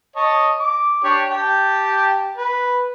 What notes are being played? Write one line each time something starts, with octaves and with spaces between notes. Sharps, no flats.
C#5 D#5 A5
D6
D4 G4 C#5
G4 G5 A5
B4